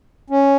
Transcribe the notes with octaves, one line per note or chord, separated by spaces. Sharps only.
C#4